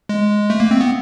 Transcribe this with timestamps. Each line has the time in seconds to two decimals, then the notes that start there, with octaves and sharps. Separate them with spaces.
0.09 G#3
0.50 A3
0.60 A#3
0.71 C4
0.81 B3